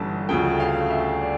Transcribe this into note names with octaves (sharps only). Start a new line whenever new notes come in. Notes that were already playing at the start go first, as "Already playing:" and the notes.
Already playing: G1 G2 E3 A3 C#4 A5
D2 C#3 F3 A3 G5
F5
E5
D5